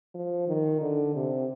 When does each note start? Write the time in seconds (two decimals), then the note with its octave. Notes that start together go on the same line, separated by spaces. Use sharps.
0.15 F3
0.48 D#3
0.81 D3
1.15 C3